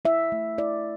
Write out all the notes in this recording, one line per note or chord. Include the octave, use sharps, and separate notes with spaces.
E4 E5
A3
E4 D5